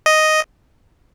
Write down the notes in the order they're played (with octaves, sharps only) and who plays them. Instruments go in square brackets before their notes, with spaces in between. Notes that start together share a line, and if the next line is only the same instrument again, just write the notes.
[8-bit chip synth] D#5